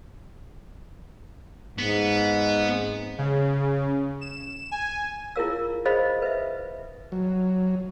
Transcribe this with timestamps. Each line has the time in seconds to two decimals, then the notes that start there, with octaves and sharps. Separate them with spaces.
1.78 G#2 B3
3.18 C#3
4.21 E7
4.71 G#5
5.36 E4 F4 G#4 A#4 F5 E6
5.85 G#4 C5 D#5 F5 B5 D#6
6.22 B4 E5
7.12 F#3